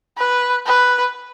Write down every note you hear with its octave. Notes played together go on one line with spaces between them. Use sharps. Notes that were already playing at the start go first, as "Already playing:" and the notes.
B4
B4